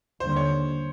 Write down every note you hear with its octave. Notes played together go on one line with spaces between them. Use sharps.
D#2 D3 G3 C5
C#5